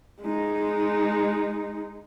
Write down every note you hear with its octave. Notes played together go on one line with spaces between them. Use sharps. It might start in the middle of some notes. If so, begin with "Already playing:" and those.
G#3 D#4